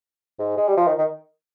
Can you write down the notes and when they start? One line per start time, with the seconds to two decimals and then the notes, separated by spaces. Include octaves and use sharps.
0.39 G#2
0.57 G#3
0.68 G3
0.77 F3
0.87 D#3
0.98 D#3